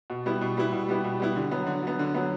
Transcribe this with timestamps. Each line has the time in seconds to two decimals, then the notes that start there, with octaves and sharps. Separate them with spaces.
0.10 B2
0.26 G3 B3 E4
0.41 B2
0.57 G3 B3 E4
0.73 B2
0.89 G3 B3 E4
1.04 B2
1.20 G3 B3 E4
1.36 D3
1.51 F#3 B3
1.67 D3
1.83 F#3 B3
1.99 D3
2.14 F#3 B3